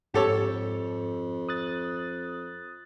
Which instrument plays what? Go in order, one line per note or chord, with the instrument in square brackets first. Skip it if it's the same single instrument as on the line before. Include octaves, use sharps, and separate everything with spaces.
[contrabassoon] F2 [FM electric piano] G#2 [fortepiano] G4 A4 C#5
[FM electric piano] D#6 F#6 A6